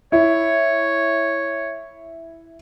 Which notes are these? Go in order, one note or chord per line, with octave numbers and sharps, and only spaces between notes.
E4 C#5